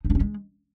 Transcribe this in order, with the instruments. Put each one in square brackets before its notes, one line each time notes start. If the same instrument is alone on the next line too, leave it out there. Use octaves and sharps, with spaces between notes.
[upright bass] D#4
D4
C#4
G#3